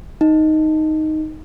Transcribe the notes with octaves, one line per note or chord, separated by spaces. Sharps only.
D#4